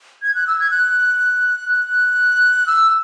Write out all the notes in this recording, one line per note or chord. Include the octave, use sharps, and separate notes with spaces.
G#6
F#6
E6
G#6
F#6
F#6
E6